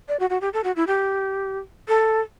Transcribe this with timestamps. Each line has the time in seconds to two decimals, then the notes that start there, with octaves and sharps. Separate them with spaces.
0.08 D5
0.20 F#4
0.30 F#4
0.41 G4
0.53 A4
0.64 F#4
0.76 E4
0.87 G4
1.88 A4